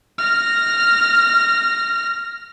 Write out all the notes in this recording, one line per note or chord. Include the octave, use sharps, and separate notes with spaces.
F6 A#6